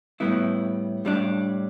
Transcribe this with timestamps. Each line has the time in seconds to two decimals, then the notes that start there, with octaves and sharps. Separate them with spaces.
0.20 A2 G3 B3 E4
1.05 A2 G3 D4